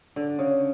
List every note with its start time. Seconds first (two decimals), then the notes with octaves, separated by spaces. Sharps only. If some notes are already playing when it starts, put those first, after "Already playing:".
0.16 D3
0.39 C#3